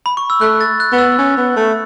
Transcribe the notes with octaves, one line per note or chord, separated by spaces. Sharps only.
B5
C#6
E6
A3 F#6
A6
F#6
B3
E6
C#4
B3
A3